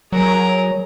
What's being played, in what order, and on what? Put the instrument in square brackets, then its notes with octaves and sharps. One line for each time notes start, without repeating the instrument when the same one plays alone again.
[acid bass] F#3 [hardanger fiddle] G#4 A#4